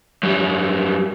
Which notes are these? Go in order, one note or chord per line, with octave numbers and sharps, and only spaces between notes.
F#2 G3